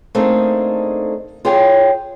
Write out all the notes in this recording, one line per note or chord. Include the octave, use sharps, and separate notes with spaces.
A3 A#3 C4 D4 D#4 G#4
F4 G4 G#4 C#5 G5